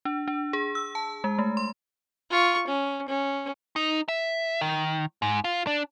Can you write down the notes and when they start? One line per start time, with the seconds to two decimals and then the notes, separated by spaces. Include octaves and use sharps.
0.05 D4
0.28 D4
0.53 G#4
0.75 E6
0.95 A5
1.24 G#3
1.38 A3
1.57 C6
2.30 F4 C#6
2.67 C#4
3.08 C#4
3.76 D#4
4.08 E5
4.61 D#3
5.22 G#2
5.44 F4
5.67 D4